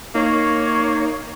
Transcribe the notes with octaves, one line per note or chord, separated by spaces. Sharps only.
A#3 D#4 C#5